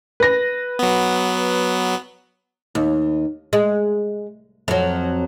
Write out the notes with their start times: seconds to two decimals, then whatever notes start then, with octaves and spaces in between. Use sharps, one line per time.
0.20 B4 A#6
0.79 F#3 B3
2.75 D#2
3.53 G#3
4.68 F2 F#3